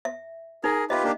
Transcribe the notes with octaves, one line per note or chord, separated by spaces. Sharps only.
E5
D#4 G#4 A#4
F4 G4 B4 D#5 E5
A#3 D4 G4